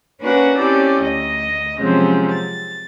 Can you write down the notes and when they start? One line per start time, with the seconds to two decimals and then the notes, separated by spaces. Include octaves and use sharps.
0.21 A#3 C#4 D4 F#4 B4 F#5
0.58 C4 C#4 E4 G4 A4 D5
1.02 D2 D#5
1.80 C3 F3 F#3 G#3 C4 C#4
2.32 A6